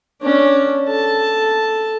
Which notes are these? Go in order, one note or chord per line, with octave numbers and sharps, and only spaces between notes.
C#4 D4
A4 A5